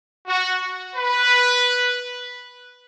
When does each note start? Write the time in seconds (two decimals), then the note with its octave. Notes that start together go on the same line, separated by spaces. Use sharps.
0.28 F#4
0.97 B4